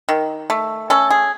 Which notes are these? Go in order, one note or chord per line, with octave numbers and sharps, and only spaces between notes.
D#3
A3
C#4 A4
G#4